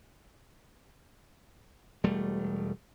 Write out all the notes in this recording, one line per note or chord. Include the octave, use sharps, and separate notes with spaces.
E1 G3 A3